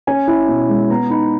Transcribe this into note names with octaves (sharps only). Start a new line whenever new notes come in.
C#4 G#5
E4
B2
G#3
B3 A#5
D#4 B5